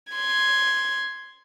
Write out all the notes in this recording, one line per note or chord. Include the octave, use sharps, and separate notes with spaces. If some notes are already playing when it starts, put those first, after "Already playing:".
C6 G#6